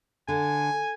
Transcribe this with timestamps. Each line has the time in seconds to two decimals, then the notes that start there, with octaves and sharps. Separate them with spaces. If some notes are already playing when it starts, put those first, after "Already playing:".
0.28 D3 G#5